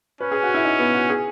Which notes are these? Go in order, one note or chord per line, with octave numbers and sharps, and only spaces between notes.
C#4 B4
G#4
F#4
E4
D#4
B3
F#4
G#4